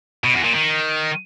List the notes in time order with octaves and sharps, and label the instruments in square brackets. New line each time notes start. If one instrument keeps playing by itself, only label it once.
[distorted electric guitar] B2
E2
A#2
D#3